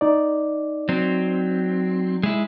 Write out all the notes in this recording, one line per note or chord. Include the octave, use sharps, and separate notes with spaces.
D#4 D5
F#3 C4
G#3 E4